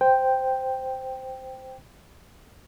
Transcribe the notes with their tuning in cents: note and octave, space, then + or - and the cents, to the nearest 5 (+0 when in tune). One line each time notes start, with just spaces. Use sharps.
C5 -5 G5 +0